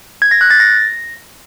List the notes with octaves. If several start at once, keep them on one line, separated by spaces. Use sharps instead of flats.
G#6
A#6
F#6
A6
A#6